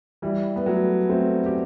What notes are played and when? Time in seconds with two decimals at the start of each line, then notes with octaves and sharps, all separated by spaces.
0.22 E3 G3
0.56 B3
0.66 F#3 A3
1.09 A3 C4
1.46 G4